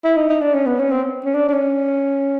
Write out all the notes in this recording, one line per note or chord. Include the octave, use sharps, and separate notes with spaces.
E4
D#4
D#4
D4
C#4
B3
C#4
C4
C#4
D4
D4
C#4